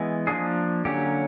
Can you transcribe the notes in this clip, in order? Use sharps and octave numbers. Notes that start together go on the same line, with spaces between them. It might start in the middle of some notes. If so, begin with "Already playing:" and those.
Already playing: E3 G#3 B3
F3 A#3 D4 G#4
D3 F#3 A#3 C#4 G4